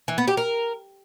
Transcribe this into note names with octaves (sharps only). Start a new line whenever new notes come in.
E3
B3
G4
A#4